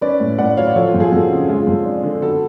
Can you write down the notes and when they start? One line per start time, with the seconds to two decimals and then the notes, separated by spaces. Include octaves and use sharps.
0.01 C#4 B4 D5
0.20 A2
0.38 A2 D5 F#5
0.57 F#3 C#5 F5
0.67 D5
0.75 F3 A4 C#5
0.87 F4
0.94 F2
0.99 F4 G#4
1.12 F2 F#4 A4
1.30 C#3
1.48 G#3 F4 G#4
1.67 F2
1.86 D4
2.03 D3
2.22 B3 F#4 A4